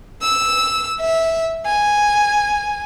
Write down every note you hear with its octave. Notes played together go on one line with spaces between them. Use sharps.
E6
E5
G#5